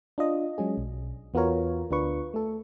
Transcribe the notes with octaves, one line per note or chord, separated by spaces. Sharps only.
D4 F4 D#5
F#3 G#3 C#4 G#4
B1
E2 B3 F4 F#4 A#4 C#5
D2 D4 F4 B4 C#6
A3 A4